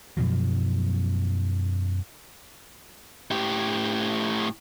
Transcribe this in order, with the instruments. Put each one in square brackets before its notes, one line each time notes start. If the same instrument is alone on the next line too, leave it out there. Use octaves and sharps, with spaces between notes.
[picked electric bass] F#2 B2 F3 F#3
[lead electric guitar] A2 G4